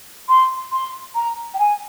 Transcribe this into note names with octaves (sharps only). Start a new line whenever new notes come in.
C6
C6
A#5
G5
G#5